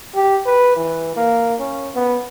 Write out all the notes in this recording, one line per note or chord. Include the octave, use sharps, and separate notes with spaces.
G4
B4
E3
A#3
C#4
B3